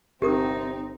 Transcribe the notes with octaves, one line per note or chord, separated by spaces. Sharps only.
G1 C3 C4 D#4 G4 A#4 D#6